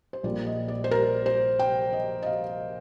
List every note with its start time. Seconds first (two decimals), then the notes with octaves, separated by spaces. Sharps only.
0.13 C5
0.23 A#1 A#2 G3 A#3 D5
0.47 D#5
0.68 D5
0.84 C5
0.91 A#4
1.26 C5
1.59 G5
1.93 D#5
2.22 D#5
2.26 F5